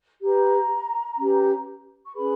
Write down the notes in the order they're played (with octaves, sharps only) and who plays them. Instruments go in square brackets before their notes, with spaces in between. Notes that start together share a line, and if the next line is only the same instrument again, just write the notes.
[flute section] G4 B4 A#5
C#4 G4 B4
C#6
C#4 G#4 B4 B5